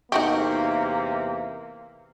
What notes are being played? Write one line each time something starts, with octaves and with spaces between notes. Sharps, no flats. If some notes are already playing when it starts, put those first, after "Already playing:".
E2 C3 A#3 D#4 F#4 G4